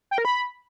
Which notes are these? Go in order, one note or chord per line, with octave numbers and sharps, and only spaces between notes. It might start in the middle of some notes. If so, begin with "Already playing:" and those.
G5
A#4
B5